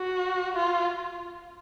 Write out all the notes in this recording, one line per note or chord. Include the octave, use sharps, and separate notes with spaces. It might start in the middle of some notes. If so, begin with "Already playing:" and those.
Already playing: F#4
F4